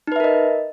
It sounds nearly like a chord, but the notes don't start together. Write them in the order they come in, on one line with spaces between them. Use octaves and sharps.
D#4 B4 E5 A#4 D#5